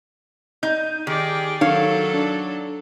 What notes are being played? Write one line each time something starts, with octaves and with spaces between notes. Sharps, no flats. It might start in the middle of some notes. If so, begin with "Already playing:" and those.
D#4 G6
D#3 G4 G#4 D5
D#3 F#3 A4 C#5 F5
D4